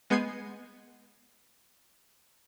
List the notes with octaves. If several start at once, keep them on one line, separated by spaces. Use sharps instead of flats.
G#3 B3 G6 G#6 C7 D#7